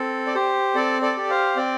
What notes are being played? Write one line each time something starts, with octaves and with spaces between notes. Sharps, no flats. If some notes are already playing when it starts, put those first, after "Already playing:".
Already playing: C4 A4
D5
G4 C5
C4 A4 D5
A4 D5
G4
C5 F5
C4 D5 G5